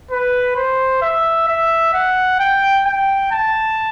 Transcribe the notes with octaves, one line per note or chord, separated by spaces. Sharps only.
B4
C5
E5
E5
F#5
G5
G5
A5